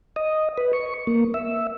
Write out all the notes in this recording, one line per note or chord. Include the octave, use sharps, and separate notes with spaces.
D#5
B4
C#6
A#3
E5